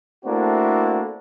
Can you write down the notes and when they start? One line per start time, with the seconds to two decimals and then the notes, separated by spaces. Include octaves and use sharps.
0.25 A3 A#3 C4 D4 E4 F#4